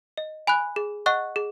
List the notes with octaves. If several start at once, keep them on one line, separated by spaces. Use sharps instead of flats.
D#5
G#5 B5 F#6
G#4
D#5 F#5 C#6 F#6
G#4